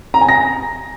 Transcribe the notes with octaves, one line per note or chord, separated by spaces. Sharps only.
A#5
G#5
A#6